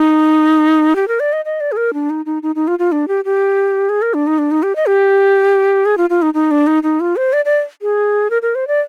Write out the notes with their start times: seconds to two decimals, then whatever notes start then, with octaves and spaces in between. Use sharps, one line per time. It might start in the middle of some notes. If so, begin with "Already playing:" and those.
Already playing: D#4
0.96 G4
1.08 A#4
1.20 D5
1.33 D#5
1.45 D#5
1.60 D5
1.72 G#4
1.77 A#4
1.94 D4
2.10 D#4
2.26 D#4
2.43 D#4
2.55 D#4
2.68 F4
2.79 F4
2.92 D4
3.08 G4
3.25 G4
3.89 G#4
4.02 A#4
4.14 D4
4.27 D#4
4.38 D4
4.51 D#4
4.63 G4
4.76 D#5
4.87 G4
5.85 G#4
5.98 F4
6.10 F4
6.22 D#4
6.34 D#4
6.51 D4
6.67 D#4
6.83 D#4
7.00 F4
7.16 C5
7.33 D5
7.45 D5
7.82 G#4
8.30 A#4
8.42 A#4
8.55 C5
8.68 D5